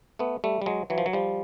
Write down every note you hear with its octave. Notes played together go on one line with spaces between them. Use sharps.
A3 B3
G3 A3
G3
F#3 G#3
E3 F#3
F3
F#3
F3 G3